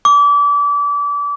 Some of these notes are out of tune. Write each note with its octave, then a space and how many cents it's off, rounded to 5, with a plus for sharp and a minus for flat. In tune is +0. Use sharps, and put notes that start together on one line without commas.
D6 -30